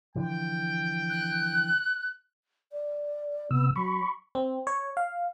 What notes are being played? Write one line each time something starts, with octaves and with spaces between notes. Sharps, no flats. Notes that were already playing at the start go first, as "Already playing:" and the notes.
D3 E3 F3 G5
F#6
D5
C3 B3 E6
F#3 B5 C#6
C4
C#5
F5